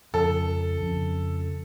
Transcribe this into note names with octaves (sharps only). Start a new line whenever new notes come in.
F2 C#3 F3 A4
F2 C#3 F3